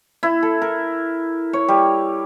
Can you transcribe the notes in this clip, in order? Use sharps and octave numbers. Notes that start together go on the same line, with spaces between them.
E4
A4
A#4
C#5
G3